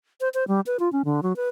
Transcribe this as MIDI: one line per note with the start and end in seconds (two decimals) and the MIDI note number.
0.21 0.29 72
0.34 0.44 72
0.48 0.60 55
0.66 0.77 71
0.80 0.91 65
0.92 1.02 61
1.05 1.21 50
1.23 1.35 54
1.36 1.49 71